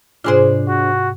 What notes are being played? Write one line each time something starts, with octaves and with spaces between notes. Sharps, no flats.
G#2 C3 D4 F4 G#4 C5
F#4